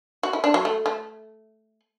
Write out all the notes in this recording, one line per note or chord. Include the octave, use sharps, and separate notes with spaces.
F#4
E4
D4
F#3
A3
A3